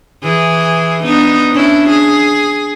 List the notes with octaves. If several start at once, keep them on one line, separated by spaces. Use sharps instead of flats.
E3 G#4
B3 D4 D#4
C#4 D4 E4
G#4